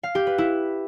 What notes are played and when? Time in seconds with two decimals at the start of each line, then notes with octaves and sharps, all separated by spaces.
0.03 F5
0.15 G4
0.27 B4
0.38 E4